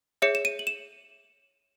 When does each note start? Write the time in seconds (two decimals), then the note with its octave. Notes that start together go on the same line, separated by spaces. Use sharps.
0.22 G#4 C#5 E5 C#7
0.35 E7
0.45 D#7
0.59 F#7
0.67 E7